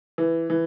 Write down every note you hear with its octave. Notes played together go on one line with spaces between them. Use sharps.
E3
E3